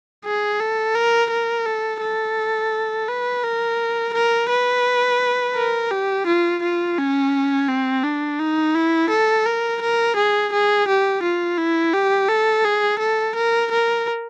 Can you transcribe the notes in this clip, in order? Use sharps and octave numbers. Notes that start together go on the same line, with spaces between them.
G#4
A4
A#4
A#4
A4
A4
B4
A#4
A#4
B4
A#4
G4
F4
F4
C#4
C4
D4
D#4
E4
A4
A#4
A#4
G#4
G#4
G4
F4
E4
G4
A4
G#4
A4
A#4
A#4